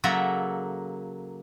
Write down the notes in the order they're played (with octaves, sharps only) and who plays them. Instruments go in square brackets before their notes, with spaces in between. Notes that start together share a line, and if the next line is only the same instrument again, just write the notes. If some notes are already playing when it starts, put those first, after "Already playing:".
[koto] C#3 F#3 A#3 A4 E5 A#5